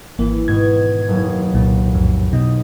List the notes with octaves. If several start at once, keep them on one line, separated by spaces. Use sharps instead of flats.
G#1 E3 A#3
G#2 B2 D#3 G#6
F#1 D#2
C2 A#2
B1 F2 A2
B2 D#4